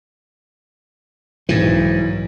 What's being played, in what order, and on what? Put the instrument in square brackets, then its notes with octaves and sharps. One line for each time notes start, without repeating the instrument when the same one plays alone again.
[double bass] B1 [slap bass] G#2 E3